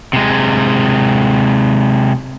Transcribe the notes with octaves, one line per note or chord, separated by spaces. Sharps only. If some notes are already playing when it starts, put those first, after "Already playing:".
C3 G#3